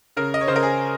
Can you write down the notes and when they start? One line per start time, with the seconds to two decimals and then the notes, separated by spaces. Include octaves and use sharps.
0.17 C#3 A#4
0.34 D#5
0.41 C#5
0.47 C#3 C5
0.56 A#4
0.63 G#4